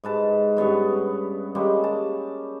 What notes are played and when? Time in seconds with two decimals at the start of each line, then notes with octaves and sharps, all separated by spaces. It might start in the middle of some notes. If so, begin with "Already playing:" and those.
0.04 G#2 B4 A5
0.57 G2 B3 C#4 C#6
1.55 G3 G#3 A#3 C#4
1.84 A5